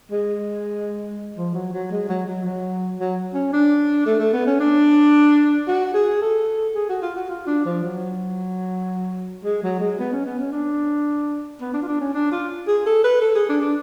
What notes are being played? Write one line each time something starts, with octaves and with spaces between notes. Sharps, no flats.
G#3
F3
F#3
F#3
G#3
F#3
F#3
F#3
F#3
C#4
D4
A3
A3
B3
C#4
D4
F#4
G#4
A4
G#4
F#4
F4
F#4
F4
D4
F3
F#3
G#3
F#3
G#3
B3
C#4
B3
C#4
D4
B3
D4
F4
D4
C#4
D4
F4
G#4
A4
B4
A4
G#4
D4
D4